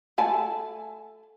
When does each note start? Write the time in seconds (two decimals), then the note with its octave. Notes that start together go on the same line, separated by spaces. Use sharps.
0.18 A3 G#5 A5